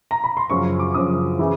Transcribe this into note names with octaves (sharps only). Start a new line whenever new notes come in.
A#5
B5
C6
F#2 C#3 F3 C#6
D6
F#2 C#3 F3 D#6
C#3 E3